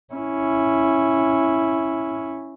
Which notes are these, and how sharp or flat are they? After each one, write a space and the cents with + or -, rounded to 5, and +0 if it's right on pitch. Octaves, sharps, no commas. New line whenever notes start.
C#4 -5 E4 +0